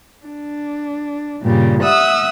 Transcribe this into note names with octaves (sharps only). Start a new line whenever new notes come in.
D4
G2 A#2 C#3 G3
E5 F#5 D#6 E6